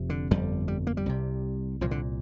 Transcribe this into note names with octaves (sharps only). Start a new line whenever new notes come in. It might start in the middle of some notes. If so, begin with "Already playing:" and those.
Already playing: F1 F2 C3
D3
G1 F2 D3 G3
G3
A#3
G3
C2 C3
C2 A#2 F3
D3